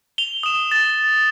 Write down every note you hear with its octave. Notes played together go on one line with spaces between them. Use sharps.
F7 G7
D#6 E7
A6